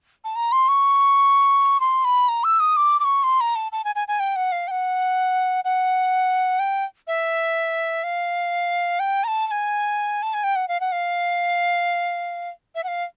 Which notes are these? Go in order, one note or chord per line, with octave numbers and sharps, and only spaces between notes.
A5
A#5
C6
C#6
C6
B5
A#5
E6
D#6
D6
D6
C#6
C6
A#5
A5
A5
G#5
G#5
G#5
G5
F#5
F5
G5
F#5
F#5
G5
E5
F5
G5
A#5
A5
A5
G#5
A5
G#5
G5
F#5
F5
F#5
F5
E5
F#5
F5